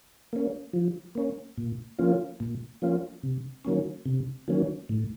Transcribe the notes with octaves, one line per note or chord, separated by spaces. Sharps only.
A#3 C#4
F3
A#3 C#4
A#2
F3 A#3 C#4 F4
A#2
F3 A#3 C#4 F4
C3
D#3 F#3 A#3 C#4
C3
D#3 F#3 A#3 C#4
A2